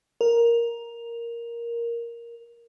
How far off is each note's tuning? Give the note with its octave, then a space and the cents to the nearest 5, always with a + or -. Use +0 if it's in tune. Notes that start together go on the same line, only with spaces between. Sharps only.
A#4 +5